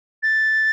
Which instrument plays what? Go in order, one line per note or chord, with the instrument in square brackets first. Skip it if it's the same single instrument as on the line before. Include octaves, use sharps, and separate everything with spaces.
[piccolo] A6